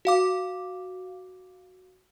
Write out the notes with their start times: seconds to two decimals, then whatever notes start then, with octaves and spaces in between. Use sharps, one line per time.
0.05 F#4 F5 D6